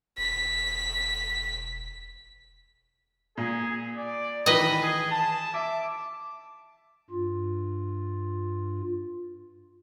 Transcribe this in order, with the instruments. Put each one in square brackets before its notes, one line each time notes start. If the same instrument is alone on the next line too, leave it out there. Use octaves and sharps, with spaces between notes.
[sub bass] E1 [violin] B6
[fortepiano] A#2 [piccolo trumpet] G#4
[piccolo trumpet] D5
[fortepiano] D#3 E3 [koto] B4 D#5 [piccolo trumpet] B5
[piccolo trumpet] G#4
A5
[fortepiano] E5 [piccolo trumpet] D6
[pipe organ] G2 F4